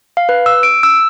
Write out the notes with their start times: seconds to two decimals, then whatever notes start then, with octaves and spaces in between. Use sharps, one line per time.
0.17 F5
0.29 B4
0.46 E6
0.63 D7
0.83 E6